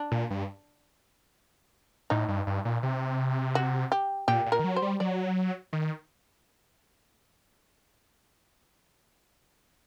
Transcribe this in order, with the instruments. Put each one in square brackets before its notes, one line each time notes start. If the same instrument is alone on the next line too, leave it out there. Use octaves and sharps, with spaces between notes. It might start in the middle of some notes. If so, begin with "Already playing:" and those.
Already playing: [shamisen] D4
[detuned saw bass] A#2
G2
[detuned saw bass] A2 [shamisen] D#4
[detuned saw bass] G2
G2
A#2
C3
[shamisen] F#4
G4
[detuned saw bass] A#2 [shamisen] G4
[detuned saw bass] A#2
[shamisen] A#4
[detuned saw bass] D#3
F#3
[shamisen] C5
[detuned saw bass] G3
[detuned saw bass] F#3 [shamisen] D5
[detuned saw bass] D#3